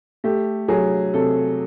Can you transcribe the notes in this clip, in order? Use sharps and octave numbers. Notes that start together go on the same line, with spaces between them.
A3 G4
F#3 G#4
C3 A4